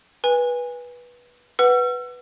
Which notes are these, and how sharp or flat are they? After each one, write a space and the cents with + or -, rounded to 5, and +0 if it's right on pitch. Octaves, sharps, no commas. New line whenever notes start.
B4 -15 G#5 -25
B4 +0 F#5 +10 E6 +40